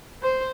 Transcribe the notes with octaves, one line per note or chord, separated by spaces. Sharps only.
C5